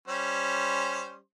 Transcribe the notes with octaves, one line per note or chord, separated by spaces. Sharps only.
G3 C#4 C5